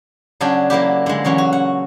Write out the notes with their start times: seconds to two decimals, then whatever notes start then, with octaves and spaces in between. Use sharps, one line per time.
0.41 C#3 F#3 D4 G5 G#5
0.70 F#3 A#3 E4 G4
1.06 D3 G#3
1.24 C#3 E3 F#3 C#4
1.38 F#4
1.53 F#5